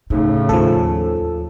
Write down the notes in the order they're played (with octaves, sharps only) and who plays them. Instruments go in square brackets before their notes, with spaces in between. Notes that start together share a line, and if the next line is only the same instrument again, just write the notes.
[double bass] A2 C#3 [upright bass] D#4
[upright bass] D#2 [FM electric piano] F3 A4